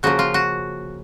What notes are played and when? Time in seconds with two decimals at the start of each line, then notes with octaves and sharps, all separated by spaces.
0.03 C#3 F3 A#3 F#4
0.19 F4
0.34 F#4